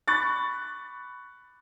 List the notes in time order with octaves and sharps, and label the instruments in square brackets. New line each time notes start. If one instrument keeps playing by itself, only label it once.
[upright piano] B5 C#6 F#6 A6